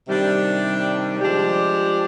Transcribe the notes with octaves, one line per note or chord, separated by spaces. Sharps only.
C3 D#3 G3 D4
F3 G#3 D4 G4